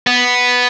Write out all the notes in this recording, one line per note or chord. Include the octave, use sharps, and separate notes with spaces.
B3